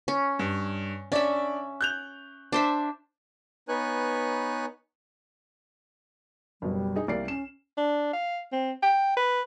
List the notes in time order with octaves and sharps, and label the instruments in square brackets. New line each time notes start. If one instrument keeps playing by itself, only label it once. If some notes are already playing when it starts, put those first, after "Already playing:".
[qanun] C#4
[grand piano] G2
[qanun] C#4 E5 [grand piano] D4 D5
[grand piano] F#6 G6 F7
[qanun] D4 C5 E5
[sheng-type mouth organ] B3 D#4 B4 C#5 G#5 F#6
[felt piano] F#1 B2 [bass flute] G3
[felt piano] D#4 G#4
[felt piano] C2 D5 C7 [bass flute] A#3
[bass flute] C#4 [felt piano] E7
[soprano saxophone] D4
F5
C4
G5
B4